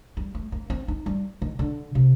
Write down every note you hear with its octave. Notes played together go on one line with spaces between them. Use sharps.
G3
A3
A#3
C4
D#4
G3
D#3
D3
C3